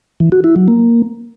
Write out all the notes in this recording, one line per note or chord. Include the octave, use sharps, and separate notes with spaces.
E3
F#4
E4
F#3
A#3